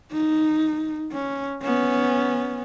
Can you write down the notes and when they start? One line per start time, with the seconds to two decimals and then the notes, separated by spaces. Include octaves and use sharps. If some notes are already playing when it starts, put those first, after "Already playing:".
0.12 D#4
1.11 C#4
1.62 B3 C#4